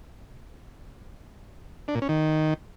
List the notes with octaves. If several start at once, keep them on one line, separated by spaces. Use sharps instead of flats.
D4
A#2
C#4
D#3